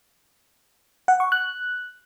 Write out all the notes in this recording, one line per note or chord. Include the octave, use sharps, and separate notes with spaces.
F#5
C#6
F#6